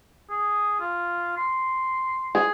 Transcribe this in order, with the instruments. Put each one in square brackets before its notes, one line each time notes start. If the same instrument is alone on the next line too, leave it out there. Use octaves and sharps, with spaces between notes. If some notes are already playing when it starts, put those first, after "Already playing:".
[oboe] G#4
F4
C6
[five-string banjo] G#4